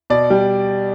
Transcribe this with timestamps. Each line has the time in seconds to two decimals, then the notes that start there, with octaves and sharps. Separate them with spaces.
0.10 B2 D5
0.30 G3